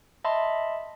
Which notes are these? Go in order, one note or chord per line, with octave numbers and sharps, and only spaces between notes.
D#5 E5 A5 B5 C6